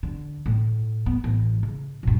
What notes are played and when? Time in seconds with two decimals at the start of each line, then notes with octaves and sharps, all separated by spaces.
0.03 D3
0.46 A2
1.06 B3
1.24 A1
1.63 C#3
2.03 G2 A#2